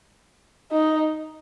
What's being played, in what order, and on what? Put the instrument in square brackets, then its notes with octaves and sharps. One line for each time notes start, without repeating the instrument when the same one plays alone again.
[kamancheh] D#4